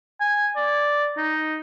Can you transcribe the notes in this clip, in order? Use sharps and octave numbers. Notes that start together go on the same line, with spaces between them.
G#5
D5
D#4